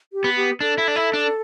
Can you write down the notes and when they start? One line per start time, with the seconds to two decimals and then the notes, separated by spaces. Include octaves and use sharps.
0.13 G4
0.24 B3
0.37 G4
0.60 D4 A4
0.78 E4
0.88 D4
0.96 E4
1.14 D4